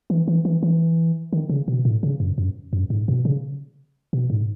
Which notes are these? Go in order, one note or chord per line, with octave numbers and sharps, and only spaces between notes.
E3
E3
E3
E3
D#3
C#3
B2
A2
C#3
F#2
F#2
F#2
G#2
B2
C#3
B2
G#2